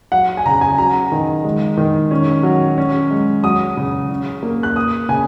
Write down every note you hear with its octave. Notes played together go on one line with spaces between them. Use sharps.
F#3 F#5
G#5
C#3 A#5
G#5
F#3 A#5
D#3
G#3
D#3
C#4
F#3
C#4
G#3
F#3 D#6
C#3
C#4
A#3
F#6
A#3 D#6
C#3 G#5